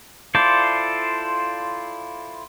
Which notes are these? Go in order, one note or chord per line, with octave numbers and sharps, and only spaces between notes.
E4 F4 A4 C5 D5